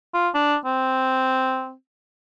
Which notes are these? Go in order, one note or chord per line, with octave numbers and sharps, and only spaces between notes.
F4
D4
C4